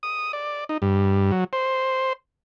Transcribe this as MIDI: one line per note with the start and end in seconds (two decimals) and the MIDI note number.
0.03 0.32 87
0.33 0.64 74
0.69 0.78 63
0.82 1.31 43
1.31 1.44 54
1.53 2.13 72